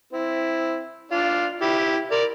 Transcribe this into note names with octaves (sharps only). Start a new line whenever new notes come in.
C4 E4
D4 F4
E4 G4
A#4 D5